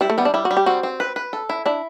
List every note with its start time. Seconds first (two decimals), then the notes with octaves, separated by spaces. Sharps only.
0.01 G3 E4
0.10 A3
0.18 G3 B3
0.25 D4
0.34 G3 E4
0.45 F#4
0.51 G3
0.57 G4
0.66 C4 F#4
0.83 C4
1.00 B4
1.16 B4
1.33 A4
1.49 E4
1.66 D4 E4